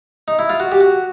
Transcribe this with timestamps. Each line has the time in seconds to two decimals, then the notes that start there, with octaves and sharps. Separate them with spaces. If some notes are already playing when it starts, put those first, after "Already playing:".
0.28 D#4
0.39 E4
0.49 F4
0.60 F#4
0.72 G4
0.81 F#4